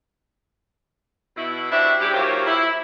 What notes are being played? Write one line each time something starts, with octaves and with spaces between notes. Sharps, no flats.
B2 E4
D4 E4 F#4 G4 C5 E5
G#2 G3 C#4 E4 G4
D#2 F#3 A#3 F4 G4 C5
E4